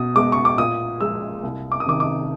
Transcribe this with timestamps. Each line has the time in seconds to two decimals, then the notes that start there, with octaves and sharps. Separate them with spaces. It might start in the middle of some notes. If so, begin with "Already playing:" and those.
Already playing: B2 D#6
0.15 G#3 B3 D6
0.32 C#6
0.45 D6
0.58 A#2 D#6
1.01 F3 G#3 E6
1.43 C2
1.72 D6
1.80 D#6
1.86 C3 D#3 D6
2.00 D6